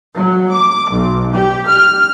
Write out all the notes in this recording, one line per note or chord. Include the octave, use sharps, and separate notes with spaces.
F#3
D6
B1
G4
F6